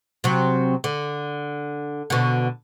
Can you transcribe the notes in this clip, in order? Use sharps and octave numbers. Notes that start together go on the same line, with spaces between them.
C3 F#3
D3
B2 D3